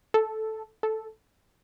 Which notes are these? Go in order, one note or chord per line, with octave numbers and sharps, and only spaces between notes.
A4
A4